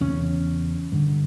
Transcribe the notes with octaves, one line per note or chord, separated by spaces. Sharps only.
E2 C#3 C#4
G2 D3